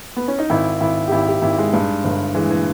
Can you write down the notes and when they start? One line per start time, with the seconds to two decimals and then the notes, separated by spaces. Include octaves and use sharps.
0.16 B3
0.28 C#4
0.39 D#4
0.50 G#1 E4
0.81 G#1 E4
1.08 G4
1.12 G#1 E4
1.27 G4
1.42 G#1 E4
1.58 G#3
1.73 G2
2.05 G1
2.35 E3 G#3
2.50 E3